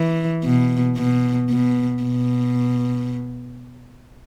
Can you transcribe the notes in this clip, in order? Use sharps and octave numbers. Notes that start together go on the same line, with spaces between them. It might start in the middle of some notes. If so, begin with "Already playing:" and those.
Already playing: E3
B2
B2
B2
B2